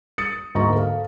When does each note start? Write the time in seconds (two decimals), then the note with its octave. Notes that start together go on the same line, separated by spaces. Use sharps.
0.18 D#6 A6 C#7
0.55 D2 G#2 A#3 A#5 C#6
0.76 A4 F5